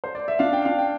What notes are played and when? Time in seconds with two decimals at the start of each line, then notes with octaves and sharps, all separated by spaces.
0.04 C5
0.15 D5
0.28 E5
0.39 D4 F5
0.53 G5
0.65 D4 F5
0.79 G5